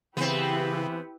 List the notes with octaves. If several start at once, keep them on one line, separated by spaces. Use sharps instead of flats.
C#3 E3 B3 C4 E4 G4 B4